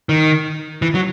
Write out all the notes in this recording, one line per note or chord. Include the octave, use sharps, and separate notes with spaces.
D#3
E3
F#3